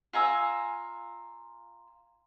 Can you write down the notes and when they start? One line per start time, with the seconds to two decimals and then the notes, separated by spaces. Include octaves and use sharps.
0.13 F4 G#5 A#5 E6